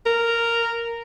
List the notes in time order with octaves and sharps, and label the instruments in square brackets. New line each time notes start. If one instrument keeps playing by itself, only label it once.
[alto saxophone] A#4